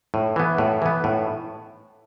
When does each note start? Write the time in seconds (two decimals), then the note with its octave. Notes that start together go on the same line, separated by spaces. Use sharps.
0.14 A2
0.36 E3 B3
0.58 A2
0.82 E3 B3
1.04 A2